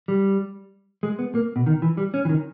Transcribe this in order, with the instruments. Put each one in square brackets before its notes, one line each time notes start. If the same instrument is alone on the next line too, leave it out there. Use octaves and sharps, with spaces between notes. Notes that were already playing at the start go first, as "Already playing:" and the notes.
[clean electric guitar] G3
G#3
B3
A#3
B2
D#3
E3
G3
C#4
E3
D#3